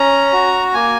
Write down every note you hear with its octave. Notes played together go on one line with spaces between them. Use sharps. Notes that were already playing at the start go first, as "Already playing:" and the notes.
Already playing: C#4 A#5
F#4
A#3 G#5